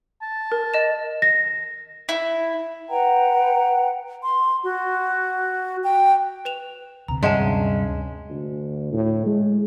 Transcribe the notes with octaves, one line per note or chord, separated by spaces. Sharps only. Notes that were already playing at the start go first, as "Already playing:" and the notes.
A5
A#4
D#5 E7
A#6
E4
B4 F#5 G5 A#5
C6
F#4
G5
B4 E7 F7
D2 C3 A#5
G2 G#3 C#4 E5 F#5 A5
D2
A2
G#3